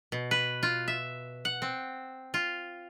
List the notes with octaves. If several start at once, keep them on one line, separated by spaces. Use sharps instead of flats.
B2
B4
F4
E5
F#5
C4
F4